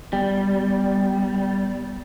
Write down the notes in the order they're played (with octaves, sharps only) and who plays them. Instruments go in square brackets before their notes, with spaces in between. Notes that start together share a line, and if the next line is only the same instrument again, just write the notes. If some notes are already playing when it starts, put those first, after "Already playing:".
[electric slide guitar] G3 [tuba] B3